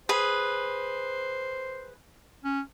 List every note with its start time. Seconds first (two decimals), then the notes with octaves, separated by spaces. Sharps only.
0.09 G#4 B4 C5
2.44 C#4